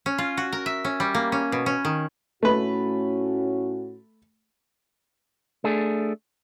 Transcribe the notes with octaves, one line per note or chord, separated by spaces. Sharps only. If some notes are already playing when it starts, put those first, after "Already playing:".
C#4
F4
F#4
A#4
E5
C#4
G3
A#3
C#4
B2
C#4
D#3
A2 A3 C#4 F#4 B4
A3 D4 G#4